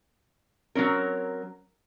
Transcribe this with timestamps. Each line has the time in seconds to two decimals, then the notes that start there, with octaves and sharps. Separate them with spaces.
0.75 F#3 C4 C#4 A#4